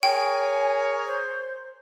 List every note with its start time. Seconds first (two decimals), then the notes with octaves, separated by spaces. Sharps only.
0.03 G#4 A#4 C#5 G5 G#5
1.06 C5